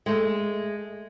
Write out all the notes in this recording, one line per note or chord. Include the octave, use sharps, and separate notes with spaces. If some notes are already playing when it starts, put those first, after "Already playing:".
G#3 A3